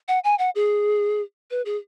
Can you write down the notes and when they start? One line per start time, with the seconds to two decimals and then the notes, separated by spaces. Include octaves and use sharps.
0.08 F#5
0.24 G#5
0.39 F#5
0.55 G#4
1.51 B4
1.65 G#4